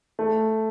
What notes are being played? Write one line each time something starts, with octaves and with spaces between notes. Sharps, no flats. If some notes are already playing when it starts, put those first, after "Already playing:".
A3